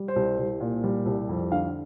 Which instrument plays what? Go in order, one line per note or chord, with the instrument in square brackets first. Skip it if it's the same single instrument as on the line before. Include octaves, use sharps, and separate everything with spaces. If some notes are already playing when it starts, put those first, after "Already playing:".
Already playing: [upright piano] G3
C5
C2
C2
A#2
G3
C2
F2
D3 F5